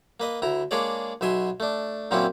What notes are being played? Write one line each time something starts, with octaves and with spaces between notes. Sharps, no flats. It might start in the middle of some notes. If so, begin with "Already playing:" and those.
A#3 B4 D#5
D2 E4 A#5
G#3 A#3 D4 G#4 C#5 D5
B1 B2 E5 G#5 C6
A3 D4
F#2 A#2 A#3 C4 C#4 E4